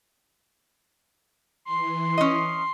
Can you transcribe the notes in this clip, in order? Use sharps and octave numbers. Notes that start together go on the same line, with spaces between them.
E3 C6
C#4 D#5